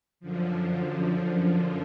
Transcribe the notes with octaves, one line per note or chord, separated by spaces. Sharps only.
F#2 D3 F3